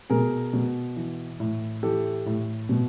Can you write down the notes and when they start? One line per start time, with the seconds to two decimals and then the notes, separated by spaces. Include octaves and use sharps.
0.10 B2 G#4 A#4
0.53 B2
0.96 E3
1.40 A2
1.83 E3 G4 A4
2.26 A2
2.69 B2